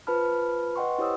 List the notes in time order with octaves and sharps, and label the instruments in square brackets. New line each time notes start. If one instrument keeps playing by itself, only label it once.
[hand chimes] F4 B4 C5 A5 B5 F6
B4 D#5 F#5 G5 C6 C#6
E4 G4 C5 C#5 D#6 E6